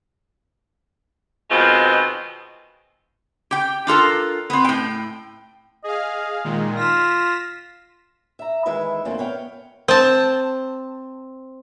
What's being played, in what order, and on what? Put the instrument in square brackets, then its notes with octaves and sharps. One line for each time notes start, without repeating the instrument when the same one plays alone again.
[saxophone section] B2 D#3 G#3 C4 F4
[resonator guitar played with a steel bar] G4 G5
D4 F4 A4 A#4
B3 C4
A2 G5
[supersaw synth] G#4 F5 [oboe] D#5
[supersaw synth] A#2 D#3 G#3
[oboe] F4 [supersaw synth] A#6 B6 E7
[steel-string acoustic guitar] E5 A#5
D#3 E3 G#3 B4 E5
F2 D3 A3 A#3 C4 C#4
B3 C#5 F5 G5
[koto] C4 A5